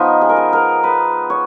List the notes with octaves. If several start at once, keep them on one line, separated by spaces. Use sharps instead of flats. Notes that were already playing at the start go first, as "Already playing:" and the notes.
Already playing: F3 B3 D#4
G#4
A#4
G#4
A#4
B4
C#5